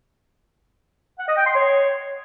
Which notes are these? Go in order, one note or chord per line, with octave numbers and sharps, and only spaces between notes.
F#5
D#5
G5
C6
C#5